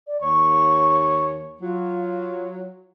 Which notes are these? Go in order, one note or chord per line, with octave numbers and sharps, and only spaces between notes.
D5
D#2 C#5 C#6
F#3 F4